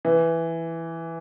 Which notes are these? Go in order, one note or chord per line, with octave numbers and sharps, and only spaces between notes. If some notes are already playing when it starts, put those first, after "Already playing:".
E3